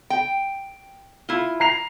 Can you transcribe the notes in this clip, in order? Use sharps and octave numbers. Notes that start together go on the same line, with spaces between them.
G5
E4 F4
A#5 C7 F7